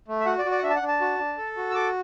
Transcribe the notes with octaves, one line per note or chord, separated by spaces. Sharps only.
A3
E5
F#4 F#5
D5
F#4
D5
F#5
D4 E5
A5
F#5
D4
A5
F#4
D4
A4
F#4
E6
A4 D6